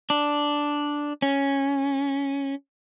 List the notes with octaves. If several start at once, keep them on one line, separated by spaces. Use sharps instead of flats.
D4
C#4